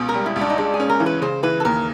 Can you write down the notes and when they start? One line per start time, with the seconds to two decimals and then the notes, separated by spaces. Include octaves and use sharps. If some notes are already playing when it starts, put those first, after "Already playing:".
Already playing: C#2 B2
0.09 A#4
0.14 G3
0.26 E4
0.36 C#2
0.41 D4
0.50 D#4
0.58 G#3 D4
0.74 G#4
0.80 C#4
0.89 A#4
1.00 E3
1.06 B4
1.22 C#3 C5
1.43 E3 B4
1.60 A4
1.65 D#2 A#4